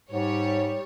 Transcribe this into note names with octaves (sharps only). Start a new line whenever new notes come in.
G#2 G3 C#5